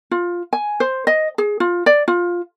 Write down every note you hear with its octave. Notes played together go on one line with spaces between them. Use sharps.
F4
G#5
C5
D#5
G#4
F4
D5
F4